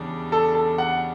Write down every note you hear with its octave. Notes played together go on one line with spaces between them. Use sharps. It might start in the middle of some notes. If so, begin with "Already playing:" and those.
Already playing: E2 C#3 G3 D4
A4
A4
F#5